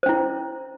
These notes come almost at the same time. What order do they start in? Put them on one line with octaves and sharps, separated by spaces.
C5 C#4 E4